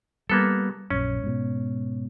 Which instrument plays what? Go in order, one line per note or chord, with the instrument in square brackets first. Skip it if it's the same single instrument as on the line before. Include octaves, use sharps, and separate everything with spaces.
[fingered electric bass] G3 [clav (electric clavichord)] A#3 B3 A4
[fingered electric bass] A#1 F#2 [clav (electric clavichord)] C#4
[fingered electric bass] G#2 B2